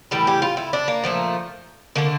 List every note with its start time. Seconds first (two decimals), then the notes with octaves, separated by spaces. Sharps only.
0.11 A2 E3 G3 A4
0.27 G4
0.42 F4
0.57 E4
0.73 D4
0.88 A#3
1.04 A#2 F3 A3
1.96 D3 A3 A#3